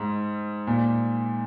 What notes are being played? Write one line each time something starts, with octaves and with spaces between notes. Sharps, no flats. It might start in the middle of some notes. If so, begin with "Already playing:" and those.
Already playing: G#2
A#2